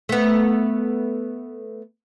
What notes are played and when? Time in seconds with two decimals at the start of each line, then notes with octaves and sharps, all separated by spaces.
0.09 A3 B3